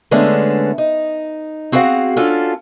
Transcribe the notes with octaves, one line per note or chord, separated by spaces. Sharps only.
D3 G#3 A3 B3 C#4 D4
D#4
C4 F#4 G#4 C#5 F5 F#5
C#4 D4 F4 F#4 A4